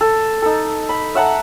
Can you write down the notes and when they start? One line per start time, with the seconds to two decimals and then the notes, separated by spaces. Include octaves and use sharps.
0.01 A4
0.42 D#4 A4
0.89 B5
1.15 E5 F#5 A5 A#5